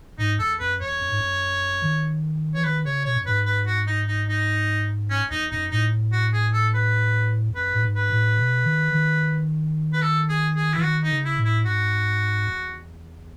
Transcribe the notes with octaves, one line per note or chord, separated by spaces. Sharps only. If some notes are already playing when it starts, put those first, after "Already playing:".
G#2 D#4
E2 A4
F#2 B4
E2 C#5
F#2
G#2
F#2
D#3
E3 C#5
D#3 B4
C#3 C#5
B2 C#5
F#2
G#2 B4
B4
F#4
D#4
D#4
D#4
C#4
E2 D#4
F#2 D#4
A2 D#4
F#4
G#4
A4
B4
E2
F#2 B4
A2
G#2
B4
A2
B2
D#3
D#3
B4
A4
G#4
G#4
E3 E4
D#3 F#4
D#4
C#3
E4
A2
E4
G#2 F#4
E2